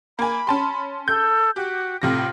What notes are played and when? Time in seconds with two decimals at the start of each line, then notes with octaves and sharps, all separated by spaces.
0.19 A#3 G#5 B5
0.47 C#4 A5 C6
1.08 A4 G6
1.56 F#4 G4
2.02 A2 C3 F4 A#6